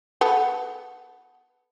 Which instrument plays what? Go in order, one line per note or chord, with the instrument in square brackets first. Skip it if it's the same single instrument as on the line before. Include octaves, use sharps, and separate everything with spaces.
[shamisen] B3 A4